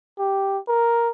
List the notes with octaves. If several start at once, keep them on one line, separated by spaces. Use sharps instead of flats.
G4
A#4